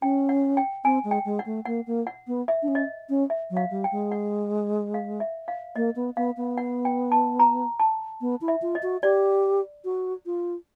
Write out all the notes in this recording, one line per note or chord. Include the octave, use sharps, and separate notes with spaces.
C#4 G5
F#5
G5
C4 G#5
G#3
G5
G#3
F#5
A3
A#3 F#5
A#3
F#5
B3
E5
D4
C#4
D#5
C#4
E5
F#3
F5
G3
G5
G#3
F#5
F5
E5
F5
A#3 D#5
B3
B3 F5
B3
F#5
G5
A5
A#5
A5
B3
E4
E5
F4
D#5
F#4
G4 D5
F#4
F4